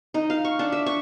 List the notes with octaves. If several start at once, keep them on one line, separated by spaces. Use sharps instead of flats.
D#4
F5
C#6
D4
E5
C#6